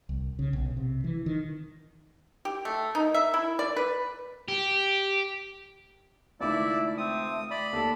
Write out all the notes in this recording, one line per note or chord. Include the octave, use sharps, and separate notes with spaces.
C2
C#3
B1
C3
E3
D#3
G4
A3
D#4
E5
E4
D5
B4
G4
C#2 D#3 A3 E4 D5 D6
C4 D#6
D5 B5
D#2 A4